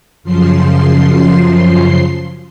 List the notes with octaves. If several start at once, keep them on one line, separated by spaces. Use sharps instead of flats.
F#2 C#3 F3 C6 C7